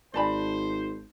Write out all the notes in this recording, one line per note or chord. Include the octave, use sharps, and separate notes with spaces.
G#1 C5 D5 A5 B5